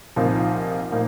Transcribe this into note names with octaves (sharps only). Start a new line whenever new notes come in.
C2 A#2 F3 A#3 D#4
A#2 F3 A#3 D#4